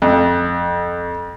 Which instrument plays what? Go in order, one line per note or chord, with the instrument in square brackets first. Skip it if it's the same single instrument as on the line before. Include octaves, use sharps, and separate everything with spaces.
[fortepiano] F2